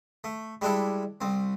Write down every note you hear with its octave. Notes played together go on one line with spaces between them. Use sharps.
A3
G3 G#3 D4 E4 A4
C2 C4